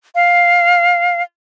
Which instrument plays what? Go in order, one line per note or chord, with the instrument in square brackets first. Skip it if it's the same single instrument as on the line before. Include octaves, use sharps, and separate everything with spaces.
[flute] F5